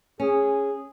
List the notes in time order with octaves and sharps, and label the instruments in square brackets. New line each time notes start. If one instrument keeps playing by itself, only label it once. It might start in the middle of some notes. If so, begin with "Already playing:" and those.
[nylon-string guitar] C#4 [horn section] G#4